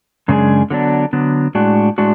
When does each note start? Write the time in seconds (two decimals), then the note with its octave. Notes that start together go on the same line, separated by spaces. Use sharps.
0.28 F#2 C#3 G#3 D4 G#4
0.70 D3 F#3 B3 D4
1.13 D3 F#3 B3 D4
1.55 A2 G#3 D4 F#4
1.98 A2 G#3 D4 F#4